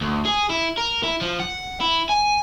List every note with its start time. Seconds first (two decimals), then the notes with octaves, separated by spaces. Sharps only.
0.01 D2
0.25 G#4
0.50 E4
0.77 A#4
1.03 E4
1.21 F3
1.40 F#5
1.81 E4
2.09 G#5